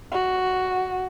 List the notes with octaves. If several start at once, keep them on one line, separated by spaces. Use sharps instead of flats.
F#4